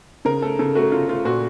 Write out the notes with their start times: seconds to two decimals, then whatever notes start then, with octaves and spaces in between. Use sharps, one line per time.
0.25 C#3 A#4
0.42 A3 A4
0.59 C#3 A4
0.75 A3 F#4
0.92 C#3 F4
1.08 A3 F4
1.25 A#2 F#4